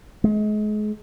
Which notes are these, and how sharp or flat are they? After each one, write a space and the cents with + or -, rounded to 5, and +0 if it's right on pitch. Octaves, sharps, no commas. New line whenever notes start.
G#3 +35